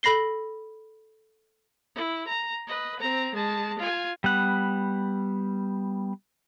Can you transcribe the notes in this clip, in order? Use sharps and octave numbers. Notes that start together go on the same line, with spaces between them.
A4 B5 A#6 C7 G7
E4
A#5
B4 D#5
C4 A#5
G#3 A5
F4 G#5
G3 B3 F#5